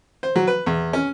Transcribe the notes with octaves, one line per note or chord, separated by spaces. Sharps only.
C5
F#3
B4
E2
C#4